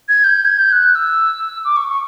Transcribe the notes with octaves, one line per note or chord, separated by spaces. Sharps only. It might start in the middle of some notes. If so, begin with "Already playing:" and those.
G#6
G6
G#6
G6
F#6
E6
D6
C#6
C#6